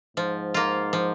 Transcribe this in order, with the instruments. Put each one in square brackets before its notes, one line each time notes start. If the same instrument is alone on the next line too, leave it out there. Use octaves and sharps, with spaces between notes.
[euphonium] G#2 [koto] F3
[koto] A#3 F4
F3